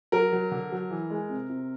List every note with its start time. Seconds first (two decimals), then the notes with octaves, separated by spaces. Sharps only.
0.12 F#3 A#4
0.33 F#3
0.52 D3
0.72 F#3
0.91 E3
1.10 G#3
1.30 C3
1.50 C3